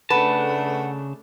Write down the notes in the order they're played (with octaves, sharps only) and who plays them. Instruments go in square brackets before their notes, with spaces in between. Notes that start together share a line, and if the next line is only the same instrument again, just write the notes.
[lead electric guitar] C#3 A5 [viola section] A3 D4 [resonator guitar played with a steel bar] B4 [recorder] F#5